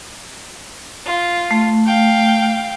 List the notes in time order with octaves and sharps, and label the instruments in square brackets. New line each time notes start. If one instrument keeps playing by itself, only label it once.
[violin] F4
[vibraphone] A3
[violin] F5 G5